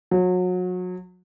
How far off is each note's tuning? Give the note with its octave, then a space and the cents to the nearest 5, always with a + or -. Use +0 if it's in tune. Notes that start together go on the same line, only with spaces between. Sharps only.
F#3 -30